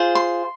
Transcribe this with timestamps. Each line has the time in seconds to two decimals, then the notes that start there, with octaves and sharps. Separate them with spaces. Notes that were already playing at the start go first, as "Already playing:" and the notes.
Already playing: F4 G#4 C5
0.15 C6